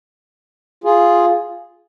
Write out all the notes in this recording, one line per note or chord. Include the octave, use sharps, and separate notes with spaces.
F4 G#4